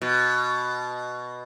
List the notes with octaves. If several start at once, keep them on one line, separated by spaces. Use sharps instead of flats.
B2